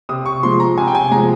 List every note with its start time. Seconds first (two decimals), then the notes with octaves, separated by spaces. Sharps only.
0.09 C3 D#6
0.26 C#6
0.43 F3 G#3 C6
0.60 A#5
0.77 C3 G#5
0.87 G5
0.95 G#5
1.11 F3 G#3 A#5